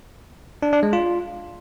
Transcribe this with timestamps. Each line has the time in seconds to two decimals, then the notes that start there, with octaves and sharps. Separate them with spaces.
0.62 D4
0.73 D4
0.83 G#3
0.93 F4